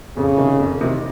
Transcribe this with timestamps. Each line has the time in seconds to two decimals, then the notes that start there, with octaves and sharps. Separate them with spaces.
0.17 F2 C#3
0.37 C3 D#3
0.60 F2
0.81 C3 D#3